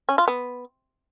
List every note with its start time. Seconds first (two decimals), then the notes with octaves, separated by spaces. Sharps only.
0.09 C#4
0.18 F4
0.28 B3